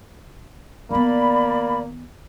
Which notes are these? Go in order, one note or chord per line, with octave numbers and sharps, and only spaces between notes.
D#3 A#3 B3 D5 B5